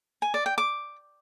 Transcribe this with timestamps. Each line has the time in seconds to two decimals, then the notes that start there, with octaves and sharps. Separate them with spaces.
0.22 G#5
0.34 D5
0.46 G5
0.58 D6